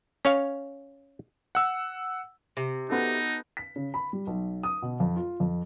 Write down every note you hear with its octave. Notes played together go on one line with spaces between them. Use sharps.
C#4 C#5 F5
F#5 E6
C3
B3 D#4 F#4 A4
B6
C#3
B5
G3
B1
D#6
B2
F2
F4
F2